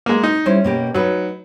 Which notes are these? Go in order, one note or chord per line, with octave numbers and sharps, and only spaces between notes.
G#3 A#3
D#4
G3 C#4 E4 C5
B2 A#3 G4
F#3 D#4 B4